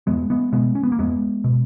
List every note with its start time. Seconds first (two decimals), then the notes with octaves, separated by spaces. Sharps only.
0.07 E2 G#3 B3
0.30 G#3 B3
0.52 B2 G#3 B3
0.75 C#4
0.83 B3
0.92 A#3
0.98 E2 G#3 B3
1.44 B2